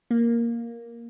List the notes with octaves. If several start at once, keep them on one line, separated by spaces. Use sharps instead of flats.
A#3